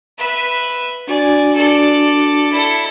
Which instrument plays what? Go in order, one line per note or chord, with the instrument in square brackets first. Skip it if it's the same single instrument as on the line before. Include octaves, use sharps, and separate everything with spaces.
[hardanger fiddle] B4 E5
[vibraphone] D4 F#4 [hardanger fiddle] D5 G#5
[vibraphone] D4 F#4 [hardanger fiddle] A4 D5
[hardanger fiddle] E4 A4